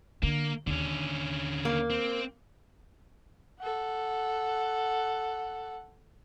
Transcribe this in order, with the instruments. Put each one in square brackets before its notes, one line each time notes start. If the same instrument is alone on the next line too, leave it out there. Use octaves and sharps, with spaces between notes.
[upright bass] D3 [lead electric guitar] A#3
[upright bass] D#2 [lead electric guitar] D3 C#4
[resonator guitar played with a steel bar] A#3
[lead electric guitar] C4
[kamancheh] A4 F#5